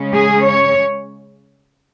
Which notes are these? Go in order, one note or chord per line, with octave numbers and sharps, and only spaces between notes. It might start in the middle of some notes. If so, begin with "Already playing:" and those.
Already playing: C#3 G#3 C#4
G#4
C#5